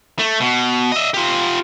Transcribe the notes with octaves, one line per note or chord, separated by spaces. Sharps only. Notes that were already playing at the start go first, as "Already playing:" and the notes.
A3
B2
D#5 E5
F4 G4